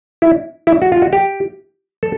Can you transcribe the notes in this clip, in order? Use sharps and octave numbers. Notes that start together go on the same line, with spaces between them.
E4
E4
F#4
F4
F#4
G4
A4